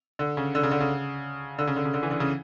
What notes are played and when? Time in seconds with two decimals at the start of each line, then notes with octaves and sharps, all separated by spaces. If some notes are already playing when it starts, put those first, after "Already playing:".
0.19 D3
0.37 C#3
0.55 D3
0.63 C#3
0.72 D3
0.80 C#3
1.59 D3
1.67 C#3
1.76 D3
1.85 C#3
1.94 D3
2.03 E3
2.11 D3
2.20 C#3